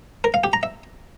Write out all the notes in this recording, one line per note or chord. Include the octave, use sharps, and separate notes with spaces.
A#4
F5
G4
A#5
E5